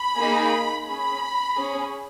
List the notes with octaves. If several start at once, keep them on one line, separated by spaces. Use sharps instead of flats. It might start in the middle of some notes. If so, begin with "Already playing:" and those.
Already playing: B5
A#3 D#4 G#4
C#4 G#4 B5
C#4 G#4